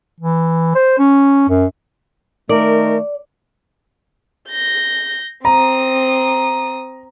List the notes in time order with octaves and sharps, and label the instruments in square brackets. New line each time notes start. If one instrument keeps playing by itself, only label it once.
[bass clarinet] E3
C5
C#4
F#2
[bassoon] D#3 [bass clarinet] A3 [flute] A#4 [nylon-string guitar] D5
[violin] G6 A#6
[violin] C4 D#6 [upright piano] A#5